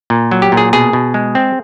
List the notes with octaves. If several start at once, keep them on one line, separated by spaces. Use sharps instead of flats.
A#2
F#3
G4
A#2
G#4
B2 G#4
B2
G#3
C4